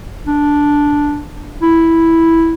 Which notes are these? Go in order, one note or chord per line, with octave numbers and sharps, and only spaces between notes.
D4
E4